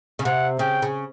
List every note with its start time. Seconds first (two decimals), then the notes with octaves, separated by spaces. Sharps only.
0.19 C#3
0.25 C3 F#5
0.59 C#3 G5
0.82 C#3